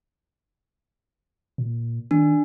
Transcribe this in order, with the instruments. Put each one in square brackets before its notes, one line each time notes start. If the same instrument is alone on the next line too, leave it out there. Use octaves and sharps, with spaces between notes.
[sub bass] A#2
[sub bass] D#3 [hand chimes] D4